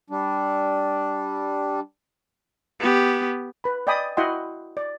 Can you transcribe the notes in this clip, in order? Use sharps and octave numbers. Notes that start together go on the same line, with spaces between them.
G3 D4
B3 G4
B4 B5
D5 D#5 G5 G#5 B5 D#6
E4 F#4 D#5 F#5 G5 C6
D5